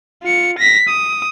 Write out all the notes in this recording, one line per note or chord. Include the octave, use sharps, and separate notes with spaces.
F4 C#7
A#6 B6
D#6